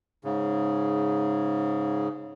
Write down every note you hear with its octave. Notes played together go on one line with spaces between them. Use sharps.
G#2 C#3